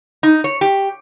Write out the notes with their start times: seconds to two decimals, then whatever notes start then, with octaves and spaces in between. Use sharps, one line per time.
0.23 D#4
0.44 C#5
0.61 G4